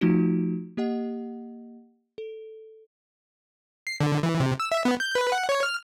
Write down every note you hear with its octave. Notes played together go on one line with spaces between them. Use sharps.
F3 A3 D#4 F4 F#4 D7
A#3 G4 D#5 F#5
A4
C7
D3
E3
C3
E6
E5
B3
G6
B4
F#5
C#5
F6